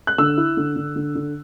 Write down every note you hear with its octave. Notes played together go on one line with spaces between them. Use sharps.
F#6
D3 E6
E4
D3
D3
D3
D3